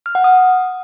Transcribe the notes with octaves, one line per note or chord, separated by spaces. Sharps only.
F6
F#5
D#6